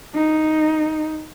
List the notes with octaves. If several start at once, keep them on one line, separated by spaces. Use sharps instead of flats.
D#4